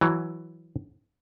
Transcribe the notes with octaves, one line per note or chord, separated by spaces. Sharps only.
E3 F#3